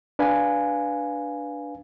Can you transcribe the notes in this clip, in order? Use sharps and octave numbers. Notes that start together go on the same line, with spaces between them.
D4 B4 F5 G#5